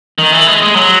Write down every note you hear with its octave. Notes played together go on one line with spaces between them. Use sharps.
D#3
E3
G#3
G#3
F#3